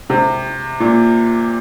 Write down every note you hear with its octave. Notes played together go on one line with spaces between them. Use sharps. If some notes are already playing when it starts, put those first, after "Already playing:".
C3
A#2